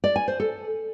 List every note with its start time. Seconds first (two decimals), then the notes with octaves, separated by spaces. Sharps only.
0.04 D5
0.16 G#5
0.28 C5
0.40 A4